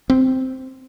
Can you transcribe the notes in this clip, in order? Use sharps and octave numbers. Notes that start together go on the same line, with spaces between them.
C4